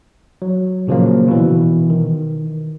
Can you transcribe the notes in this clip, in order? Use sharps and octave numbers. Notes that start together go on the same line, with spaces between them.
F#3
A#2 C#3 F3 F#3 A#3
B2 E3
D#3